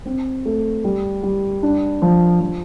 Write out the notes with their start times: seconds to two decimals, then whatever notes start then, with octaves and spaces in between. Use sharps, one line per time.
0.05 C4
0.45 A3
0.84 G3
1.23 G3
1.63 D4
2.02 F3
2.40 F3